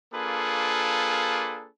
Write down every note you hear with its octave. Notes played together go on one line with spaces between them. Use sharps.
A#3 D4 F4 G#4 A4 B4